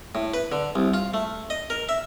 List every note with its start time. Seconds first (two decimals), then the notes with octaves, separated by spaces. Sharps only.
0.15 A2
0.34 B4
0.52 D3
0.75 C2
0.94 F4
1.14 A3
1.50 D#5
1.70 A#4
1.89 E5